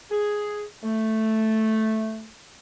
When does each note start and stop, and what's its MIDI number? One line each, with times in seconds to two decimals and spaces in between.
0.11 0.63 68
0.84 2.27 57